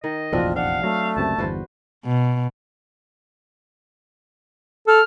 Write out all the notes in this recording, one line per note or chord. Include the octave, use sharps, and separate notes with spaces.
D#3 D#5
F1 A#1 E2 C4 D4 F4 F#4
D4 F5 F#5
F#3 A3
C#2 F#2 C3 A5
G1 E2 F#4 B4 C5
B2
A4 F6